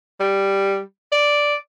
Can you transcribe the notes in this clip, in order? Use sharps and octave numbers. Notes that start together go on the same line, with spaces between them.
G3
D5